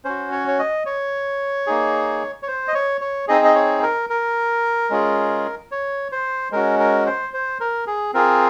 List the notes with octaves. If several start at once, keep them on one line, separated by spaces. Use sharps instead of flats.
C#4 F#4 C5
C#5
C#5
D#5
C#5
A#3 D#4 G#4
C#5
C5
D#5
C#5
C#5
C4 D#4 G#4 D#5
D#5
C#5
A#4
A#4
G#3 C#4 F4 G#4
C#5
C5
G#3 C#4 F#4 A#4
A#4
C5
C5
A#4
G#4
C4 F4 G#4 A#4